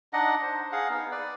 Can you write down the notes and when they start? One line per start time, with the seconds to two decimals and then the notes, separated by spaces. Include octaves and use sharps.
0.13 D4 D#4 D#5 F#5
0.42 C5
0.72 G#4 F5 F#5
0.90 B3 D#4
1.11 B4 D5